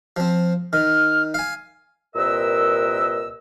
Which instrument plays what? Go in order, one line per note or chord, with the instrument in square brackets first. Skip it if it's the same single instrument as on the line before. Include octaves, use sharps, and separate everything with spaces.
[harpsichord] F3 C4
[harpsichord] D#3 [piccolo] F6
[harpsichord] F5 G#5
[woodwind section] C2 A#2 A#4 B4 D#5 E6